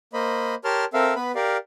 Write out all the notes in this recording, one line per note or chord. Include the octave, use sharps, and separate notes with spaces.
A#3 C5 D#5 B5
G4 A#4 C#5 A5 C6 F6
C4 A4 A#4 E5 F5
B3 B4 B5
G4 A#4 D5 F5